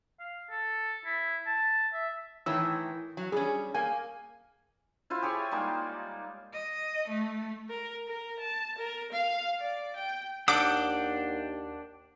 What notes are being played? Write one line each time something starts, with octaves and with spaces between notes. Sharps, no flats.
F5
A4
E4
A5
E5
A2 D#3 E3 E4 C#5 E6
F#3
G3 C#4 G#4
A#3 G#5
E4 F4 C5
G4 G#4 C#5 C#6
G3 G#3 A#3 D#4
D#5
A3
A#4
A#4
A5
A#4
F5
D5
G5
D#2 D4 F#5 G5 D6